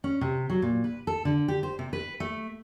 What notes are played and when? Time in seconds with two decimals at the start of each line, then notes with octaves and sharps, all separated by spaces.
0.04 C#4
0.21 C3
0.50 F#3
0.62 A#2
0.84 B4
1.07 A4
1.25 D3
1.48 G4
1.63 C5
1.79 C3
1.93 B4
2.20 A3